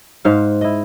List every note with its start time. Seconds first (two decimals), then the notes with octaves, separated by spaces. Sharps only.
0.25 G#2 C5 F5 F#5
0.61 E4 D#5